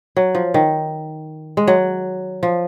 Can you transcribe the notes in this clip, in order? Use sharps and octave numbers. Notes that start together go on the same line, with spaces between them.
F#3
F3
D#3
G#3
F#3
F3